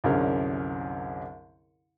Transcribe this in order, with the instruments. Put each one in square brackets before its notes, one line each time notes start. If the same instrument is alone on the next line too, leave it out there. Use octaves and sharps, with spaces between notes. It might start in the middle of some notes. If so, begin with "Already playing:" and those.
[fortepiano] C2 F#2 D3 C#4 G#4 A#4